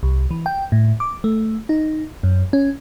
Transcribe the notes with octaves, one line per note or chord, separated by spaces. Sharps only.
C2
E3
G5
A2
D6
A3
D#4
F#2
C#4